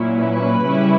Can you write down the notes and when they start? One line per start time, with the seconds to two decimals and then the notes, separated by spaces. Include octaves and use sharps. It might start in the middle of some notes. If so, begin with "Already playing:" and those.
Already playing: A#2 F#3 C#4 E4
0.18 B4
0.65 C#3 G3 C#4 E4